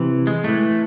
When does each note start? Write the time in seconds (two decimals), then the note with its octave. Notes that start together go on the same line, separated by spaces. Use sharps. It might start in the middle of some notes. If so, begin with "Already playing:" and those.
Already playing: C3 E3
0.27 G#3
0.44 A2 E3 A3